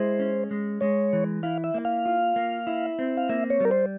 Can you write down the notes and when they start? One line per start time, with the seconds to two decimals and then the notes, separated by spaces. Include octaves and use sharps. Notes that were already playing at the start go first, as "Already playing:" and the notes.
Already playing: G#3 E4 C5
0.19 C#4
0.51 G#3
0.81 G#3 C#5
1.13 E3
1.43 E4 F5
1.64 E5
1.74 A#3
1.85 F5
2.06 F4
2.36 A#3
2.67 E4
2.99 C4
3.17 F5
3.29 A#3 E5
3.50 C#5
3.60 G3 A#4
3.71 C5